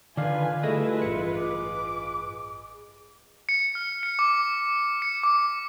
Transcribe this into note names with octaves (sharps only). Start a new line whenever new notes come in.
D3 D#3 F4 B4 D5 F5 G#5
G3 A3 E4 G#4 D#5
A1 G2 C#7
D6
C#7
F6
C#7
D6
C#7
D6